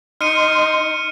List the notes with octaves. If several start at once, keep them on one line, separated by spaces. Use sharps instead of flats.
D#4 C6 F6 C#7 D#7